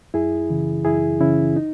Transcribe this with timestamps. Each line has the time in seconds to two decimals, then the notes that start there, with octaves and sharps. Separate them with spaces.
0.14 F#2 E4 G#4
0.50 C#3 E3
0.85 F#2 E4 G#4
1.20 C#3 E3 C#4 E4
1.56 D#4